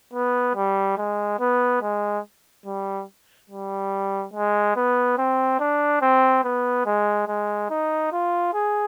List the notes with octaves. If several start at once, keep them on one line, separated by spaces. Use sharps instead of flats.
B3
G3
G#3
B3
G#3
G3
G3
G#3
B3
C4
D4
C4
B3
G#3
G#3
D#4
F4
G#4